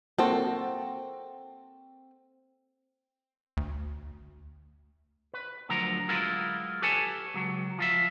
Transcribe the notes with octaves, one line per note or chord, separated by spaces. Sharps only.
A#3 C4 F#4 A4
D2
B4
D2 F3 F#3 A#4 A#5
F#3 G#3 E4 F4 A#4 B4
G4 A4 B4 C#5 G#5 A5
C#2 F#3
F3 F4 E5